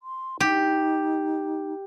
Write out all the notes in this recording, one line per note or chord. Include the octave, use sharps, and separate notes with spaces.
C6
D#4 G4